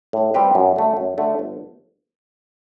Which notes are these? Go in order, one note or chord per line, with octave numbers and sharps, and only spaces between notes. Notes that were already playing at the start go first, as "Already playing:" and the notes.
A2
G3 C4 G4 B4
F#2
D3 A3
F#2
D3 A3
G1